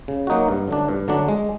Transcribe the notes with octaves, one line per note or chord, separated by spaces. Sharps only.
C#3
F#3 A#3 D#4 F#4
G2
D3 F#3 A3 D4
G2
D3 F#3 A3 D4
G#3